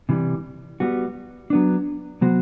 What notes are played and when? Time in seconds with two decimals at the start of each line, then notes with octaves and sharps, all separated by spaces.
0.09 C3 E3 G3
0.80 G3 B3 F#4
1.50 F#3 B3 D4
2.21 C3 F#3 B3 F#4 C5